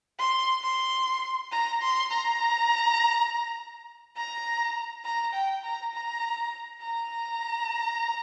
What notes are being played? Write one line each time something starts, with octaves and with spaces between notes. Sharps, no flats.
C6
C6
A#5
C6
A#5
A#5
A#5
G5
A#5
A#5
A#5